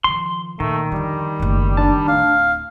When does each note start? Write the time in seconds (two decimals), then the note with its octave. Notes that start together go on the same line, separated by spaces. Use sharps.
0.04 D#3 F3 C6
0.60 A#2 D#3 A3
0.92 F2 D3 G3
1.40 F#1 A3
1.77 D4 A5
2.08 D1 E4 F5